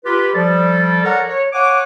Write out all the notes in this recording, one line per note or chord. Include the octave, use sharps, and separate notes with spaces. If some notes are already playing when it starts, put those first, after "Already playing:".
F4 G4 B4
F3 G3 A4 D5
A4 A#4 C#5 D5 F#5 A#5
C#5
C#5 F5 F#5 G#5 D6